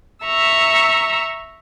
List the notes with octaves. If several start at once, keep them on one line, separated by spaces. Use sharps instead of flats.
E5 A#5 C#6 E6